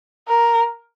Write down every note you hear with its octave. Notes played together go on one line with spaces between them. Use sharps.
A#4